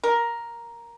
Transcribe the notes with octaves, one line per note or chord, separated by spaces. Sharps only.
A#4